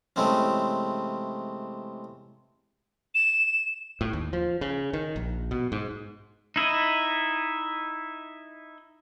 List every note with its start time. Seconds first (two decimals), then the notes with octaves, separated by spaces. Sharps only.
0.16 C3 E3 G#3 A3 C4 C#4
3.15 E7
4.01 A2
4.13 D#2
4.33 F3
4.61 C#3
4.93 D#3
5.16 A#1
5.51 B2
5.72 G#2
6.56 D#4 E4 D#5